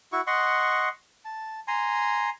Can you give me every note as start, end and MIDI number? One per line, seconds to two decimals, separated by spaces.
0.12 0.21 64
0.12 0.21 66
0.12 0.21 85
0.27 0.89 75
0.27 0.89 78
0.27 0.89 84
0.27 0.89 85
1.25 1.60 81
1.68 2.30 80
1.68 2.30 82
1.68 2.30 84